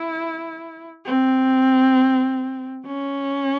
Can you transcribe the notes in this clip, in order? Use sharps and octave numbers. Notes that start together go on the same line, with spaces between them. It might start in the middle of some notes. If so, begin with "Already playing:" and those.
Already playing: E4
C4
C#4